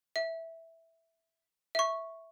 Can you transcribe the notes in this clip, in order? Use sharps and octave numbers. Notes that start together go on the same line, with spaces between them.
E5
E5 C#6